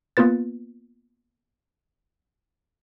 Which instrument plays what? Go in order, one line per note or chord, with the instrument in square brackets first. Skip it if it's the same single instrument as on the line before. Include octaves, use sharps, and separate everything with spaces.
[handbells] A#3 B3 F4 B4 A6